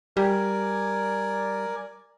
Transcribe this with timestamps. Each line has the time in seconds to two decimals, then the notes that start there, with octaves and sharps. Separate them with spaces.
0.17 G3 A#4 D5 G#5